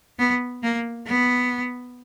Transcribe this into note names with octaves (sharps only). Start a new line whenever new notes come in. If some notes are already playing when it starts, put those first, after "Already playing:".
B3
A#3
B3